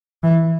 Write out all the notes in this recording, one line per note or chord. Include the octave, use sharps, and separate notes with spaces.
E3